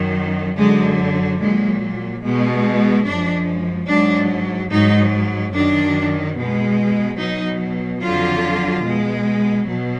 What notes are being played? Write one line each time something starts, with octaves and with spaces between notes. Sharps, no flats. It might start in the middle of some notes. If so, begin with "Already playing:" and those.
Already playing: F#2 D#3 F#3
F#2 D3 F#3 G#3
A#2 F#3 G#3
B2 G#3
F#2 F3 G#3 D4
G#2 F#3 D4
G#2 F#3 D#4
F#2 D#3 F#3 D4
B2 G#3
B2 F#3 D#4
F2 D3 F#3 F4
B2 G#3
B2 F#3